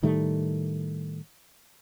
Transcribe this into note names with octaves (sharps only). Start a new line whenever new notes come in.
A2 D#3 G3 A3